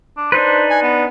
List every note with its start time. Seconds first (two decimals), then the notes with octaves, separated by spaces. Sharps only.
0.17 D4
0.32 D4 D#4 B4 C5
0.70 G#5
0.82 B3